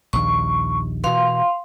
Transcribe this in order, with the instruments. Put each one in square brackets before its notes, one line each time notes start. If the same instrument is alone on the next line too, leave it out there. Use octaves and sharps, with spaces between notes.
[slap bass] A#1 D#2 [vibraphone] C#6
[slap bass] B2 E3 [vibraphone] F5 C6